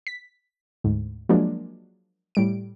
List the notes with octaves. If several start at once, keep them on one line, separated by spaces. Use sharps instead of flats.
B6
D2 G#2
F3 F#3 G#3 A#3 D4
A2 G3 D7